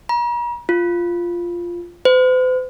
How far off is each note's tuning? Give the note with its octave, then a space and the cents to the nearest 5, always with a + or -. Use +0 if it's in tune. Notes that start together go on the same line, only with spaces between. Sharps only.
A#5 +45
F4 -5
C5 -45